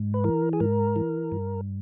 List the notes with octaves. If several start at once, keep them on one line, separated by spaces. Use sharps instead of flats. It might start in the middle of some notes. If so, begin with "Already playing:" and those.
Already playing: G#2
B4
E3 A#4
G#4
G#2 A#4
E3
G2